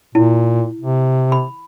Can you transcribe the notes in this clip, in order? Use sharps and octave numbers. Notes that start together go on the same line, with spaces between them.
A#2 E4
C3
B5